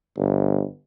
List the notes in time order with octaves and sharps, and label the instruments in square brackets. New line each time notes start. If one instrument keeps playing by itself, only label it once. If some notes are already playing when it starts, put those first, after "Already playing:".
[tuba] G1